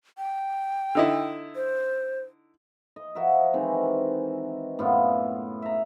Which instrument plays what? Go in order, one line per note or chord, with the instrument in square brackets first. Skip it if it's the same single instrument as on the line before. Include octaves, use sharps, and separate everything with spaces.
[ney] G5
[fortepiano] D3 D#4 E4
[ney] C5
[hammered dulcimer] D#5
F3 F#4 A#4 E5
D#3 E3 G#3 C4
F#2 A2 B3 F4
E5 A#5